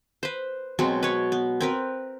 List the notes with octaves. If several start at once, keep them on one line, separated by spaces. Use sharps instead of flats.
B4 C5
B2 F#3 G#3 C4
B4 C#5
B3
C4 A#4 B4